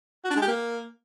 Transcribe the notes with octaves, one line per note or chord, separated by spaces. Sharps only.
F#4
D4
G#3
G4
A#3